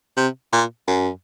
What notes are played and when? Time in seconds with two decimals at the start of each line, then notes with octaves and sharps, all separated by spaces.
0.17 C3
0.53 A#2
0.88 F#2